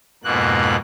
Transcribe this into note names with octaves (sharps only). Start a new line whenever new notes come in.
F2 G#2 B2 A#3 F#6